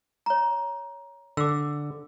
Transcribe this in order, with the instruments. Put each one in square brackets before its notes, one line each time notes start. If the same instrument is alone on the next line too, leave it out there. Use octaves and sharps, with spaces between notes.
[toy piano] C#5 A#5
[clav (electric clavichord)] D3 [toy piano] D6 E6